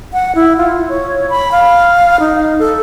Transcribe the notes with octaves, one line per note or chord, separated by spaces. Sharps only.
F#5
E4
F4
C#5
B5
F5
D#4
A4